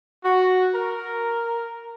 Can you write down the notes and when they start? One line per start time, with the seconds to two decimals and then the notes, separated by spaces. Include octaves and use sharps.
0.25 F#4
0.75 A#4